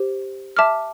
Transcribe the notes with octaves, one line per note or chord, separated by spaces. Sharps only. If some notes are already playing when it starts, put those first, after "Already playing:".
Already playing: G4 C5
E5 A5 D6 F6